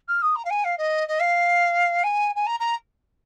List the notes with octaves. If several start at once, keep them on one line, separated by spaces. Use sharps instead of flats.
F6
D#6
A#5
F5
G#5
F5
D#5
D#5
F5
G#5
G#5
A#5
A#5